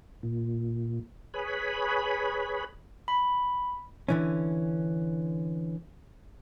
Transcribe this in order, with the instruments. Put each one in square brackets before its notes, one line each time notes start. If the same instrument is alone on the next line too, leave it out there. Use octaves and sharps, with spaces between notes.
[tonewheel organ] A#2
G#4 B4 C#5 B5
[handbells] B5
[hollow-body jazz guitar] D3 E3 C#4